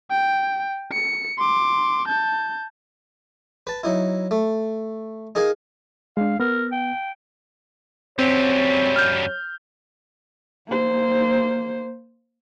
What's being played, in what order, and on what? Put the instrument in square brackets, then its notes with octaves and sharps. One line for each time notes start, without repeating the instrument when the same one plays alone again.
[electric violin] G5
C#7
C6 D6
A5 G6
[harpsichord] B4 A5
F#3 D#4 E4
A3
D#4 G#4 A#4 D#5 F5 G#5
[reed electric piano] G#3 D4 [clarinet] F5
[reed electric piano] B3 [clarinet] A#4
[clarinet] G5
[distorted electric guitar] F#2 G3 [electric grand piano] C4 [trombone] C#5
[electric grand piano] F6 G6
[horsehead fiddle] A#3 C5